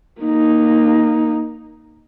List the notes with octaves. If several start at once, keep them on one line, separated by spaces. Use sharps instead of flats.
A#3 D#4